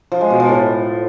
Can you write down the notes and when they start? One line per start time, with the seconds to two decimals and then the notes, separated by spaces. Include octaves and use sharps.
0.12 F3
0.21 G#3
0.30 B2
0.40 F3
0.49 A2